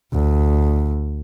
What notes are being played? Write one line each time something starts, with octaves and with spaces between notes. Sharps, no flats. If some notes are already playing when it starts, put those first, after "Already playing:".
D2